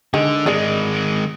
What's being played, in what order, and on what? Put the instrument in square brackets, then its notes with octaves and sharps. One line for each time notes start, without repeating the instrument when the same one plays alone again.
[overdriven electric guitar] D3 [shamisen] D#3 G#3
[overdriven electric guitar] D#3 G#3 [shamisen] G#4 D5 D#5